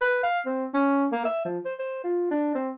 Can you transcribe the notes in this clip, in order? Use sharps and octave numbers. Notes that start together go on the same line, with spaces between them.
B4
F5
C4
C#4
A#3
E5
F3
C5
C5
F4
D4
C4